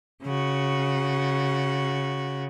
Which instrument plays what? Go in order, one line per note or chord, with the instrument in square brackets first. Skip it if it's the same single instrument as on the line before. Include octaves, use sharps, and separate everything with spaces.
[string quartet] C#3 F#4